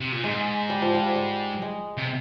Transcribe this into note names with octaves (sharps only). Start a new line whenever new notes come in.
C3
A#2
G#2 G#3
G3
F3
G3
G3
G#3
C3